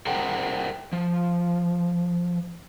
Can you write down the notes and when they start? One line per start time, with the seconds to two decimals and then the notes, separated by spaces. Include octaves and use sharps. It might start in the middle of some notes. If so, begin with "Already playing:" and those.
0.06 G#4 A#4 C5 D5 F#5 G5
0.93 F3